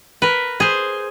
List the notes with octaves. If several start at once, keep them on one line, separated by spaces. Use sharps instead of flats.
A#4 B4
G#4 C5